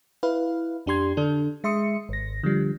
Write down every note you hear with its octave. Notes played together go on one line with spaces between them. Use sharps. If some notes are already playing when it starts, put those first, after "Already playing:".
E4 B4 F5
F2 D4 G4 C6 G#6
D3 D4 A4
G#3 E5 C6 D#6 C#7
G#1 A#6
D3 F3 G3